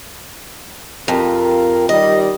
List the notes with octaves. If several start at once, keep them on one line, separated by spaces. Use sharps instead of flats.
F2 F4 G4 A#4
D#3 G3 D#5